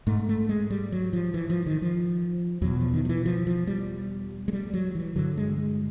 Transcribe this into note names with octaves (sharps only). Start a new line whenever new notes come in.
G#2 A3
A3
G#3
G3
F#3
F3
E3
F3
D#3
F3
E2 B2 F#3
F3
D#3
F3
E3
F3
F3
G3
G#3
G3
F#3
E3
G2 D3 F#3
G#3
G#3